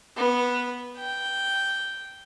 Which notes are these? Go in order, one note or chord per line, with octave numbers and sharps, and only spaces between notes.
B3
G5